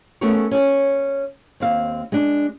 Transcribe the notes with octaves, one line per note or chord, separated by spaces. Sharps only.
A3 B3 C#4 G#4 A#4 C#5
C#4 D5
D#2 C4 F5
G#3 D4